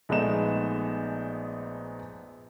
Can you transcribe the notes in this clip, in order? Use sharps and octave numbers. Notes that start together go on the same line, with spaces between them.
A#1 G#3 A3 B3 D#4 E7